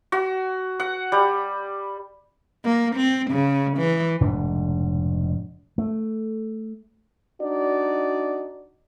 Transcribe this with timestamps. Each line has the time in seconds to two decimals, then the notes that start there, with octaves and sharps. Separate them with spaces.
0.12 F#4
0.80 F#5
1.12 G3
2.64 A#3
2.96 C4
3.31 C#3
3.78 E3
4.21 F1 G#2 B2 D4
5.78 A3
7.41 D4 D#4 F#4 D5